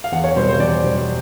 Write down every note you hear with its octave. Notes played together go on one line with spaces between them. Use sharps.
F5
E2 F#5
C#5
B2 G3 C4 C5
C5
E2 D5
B2 G3 C4